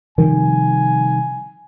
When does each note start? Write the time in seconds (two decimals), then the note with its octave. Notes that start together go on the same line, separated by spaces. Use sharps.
0.18 C3 D#3 F3 G3 G#5